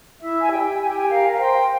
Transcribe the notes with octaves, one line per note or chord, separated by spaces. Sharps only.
E4 E5
G#5
G4 G5
G4 G#5
G5
G#5
A#4 F5
F5
C5 G5